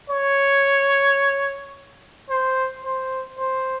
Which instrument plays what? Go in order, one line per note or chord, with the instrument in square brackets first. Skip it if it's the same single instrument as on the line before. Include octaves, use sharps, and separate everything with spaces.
[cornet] C#5
C5
C5
C5